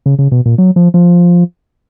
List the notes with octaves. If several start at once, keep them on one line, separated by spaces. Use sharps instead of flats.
C#3
C#3
B2
A#2
F#3
F3
F3